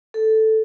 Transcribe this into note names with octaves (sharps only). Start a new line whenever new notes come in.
A4